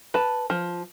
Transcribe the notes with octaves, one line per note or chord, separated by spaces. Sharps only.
B4 A5
F3